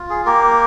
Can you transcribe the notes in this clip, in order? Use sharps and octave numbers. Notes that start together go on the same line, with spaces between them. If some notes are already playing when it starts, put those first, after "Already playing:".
Already playing: F4
G#4
A#3 G4 A#4